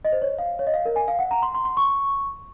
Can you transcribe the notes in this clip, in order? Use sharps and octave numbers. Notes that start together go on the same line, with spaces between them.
D#5
C5
C#5
F5
C#5
D#5
F5
A#4
G#5
F5
F#5
A#5
C6
C6
C6
C#6